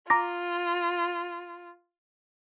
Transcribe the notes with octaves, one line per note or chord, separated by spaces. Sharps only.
F4 A#5 D6 A#6